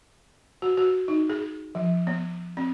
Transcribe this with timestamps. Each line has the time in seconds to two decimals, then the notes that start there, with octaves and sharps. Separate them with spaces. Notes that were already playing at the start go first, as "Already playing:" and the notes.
0.62 F#4
0.77 F#4
1.08 D#4
1.30 G#4
1.75 F3
2.07 B3
2.57 C4